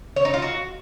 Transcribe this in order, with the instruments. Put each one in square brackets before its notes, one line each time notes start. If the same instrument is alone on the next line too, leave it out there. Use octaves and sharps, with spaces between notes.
[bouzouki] C#5
D#4
F4
F#4